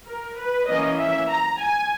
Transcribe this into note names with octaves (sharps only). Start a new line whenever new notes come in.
A#4
B4
E3 A#3 C#4 D#5
E5
A#5
G#5